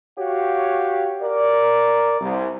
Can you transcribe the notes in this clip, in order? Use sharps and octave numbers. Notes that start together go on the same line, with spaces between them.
F#4 G4 C#5 F5
A#4 D5
C2